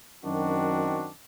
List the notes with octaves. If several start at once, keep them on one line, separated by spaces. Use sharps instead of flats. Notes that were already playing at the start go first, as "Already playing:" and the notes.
F#2 D#3 C4 D4 F#4